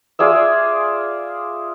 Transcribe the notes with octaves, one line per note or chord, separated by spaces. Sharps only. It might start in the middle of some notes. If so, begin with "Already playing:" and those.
F4 G#4 D5 E5